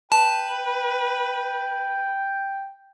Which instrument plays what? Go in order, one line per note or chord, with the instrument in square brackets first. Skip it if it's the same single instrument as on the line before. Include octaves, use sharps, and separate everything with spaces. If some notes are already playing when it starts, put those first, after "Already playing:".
[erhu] B4 [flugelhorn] G5 [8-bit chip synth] A5